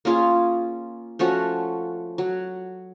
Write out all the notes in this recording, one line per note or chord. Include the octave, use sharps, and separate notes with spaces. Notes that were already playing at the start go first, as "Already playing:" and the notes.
A#3 C#4 F4 G#4
F3 A3 C#4 F#4
F#3